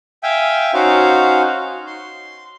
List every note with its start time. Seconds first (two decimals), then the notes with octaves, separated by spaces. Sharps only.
0.23 E5 F5 G5 G#5
0.74 C#4 D#4 F#4 C5 F5
1.87 C6